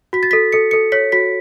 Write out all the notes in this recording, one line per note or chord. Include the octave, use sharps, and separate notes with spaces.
F#4 B6
A6
A4 B6
A4 C#7
A4 C#7
C#5 B6
F#4 B6